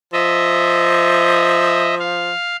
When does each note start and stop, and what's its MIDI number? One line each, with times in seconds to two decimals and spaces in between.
0.13 2.31 53
0.13 1.95 75
0.13 1.95 76
1.99 2.56 77